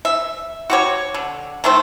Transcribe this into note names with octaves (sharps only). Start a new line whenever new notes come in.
E5
F#4 G4 C#5
D3
D#3 A3 C5